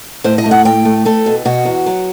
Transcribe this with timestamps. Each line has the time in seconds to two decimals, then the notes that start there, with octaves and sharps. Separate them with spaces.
0.24 A2 C5
0.38 D#5
0.46 A3
0.51 F#5
0.65 A2 G5
0.85 A3
1.05 A3 A4
1.26 B2
1.45 B2 F#4
1.65 E2
1.86 F#3